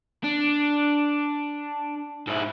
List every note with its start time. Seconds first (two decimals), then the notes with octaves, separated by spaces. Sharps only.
0.24 D4
2.27 G#2 E4